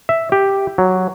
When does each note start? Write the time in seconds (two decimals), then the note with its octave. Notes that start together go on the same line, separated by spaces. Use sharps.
0.09 E5
0.32 G4
0.78 F#3